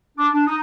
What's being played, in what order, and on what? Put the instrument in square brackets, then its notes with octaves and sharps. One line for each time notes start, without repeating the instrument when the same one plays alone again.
[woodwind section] D4 [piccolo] D6
[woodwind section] D4
[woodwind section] D#4 [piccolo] D#6